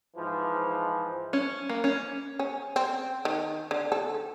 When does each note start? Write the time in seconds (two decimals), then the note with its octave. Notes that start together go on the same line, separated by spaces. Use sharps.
0.16 G#2 E3 F3
1.33 C#4
1.69 A#3
1.84 C#4
2.39 C#4
2.76 C4
3.25 D#3
3.71 D3
3.92 A4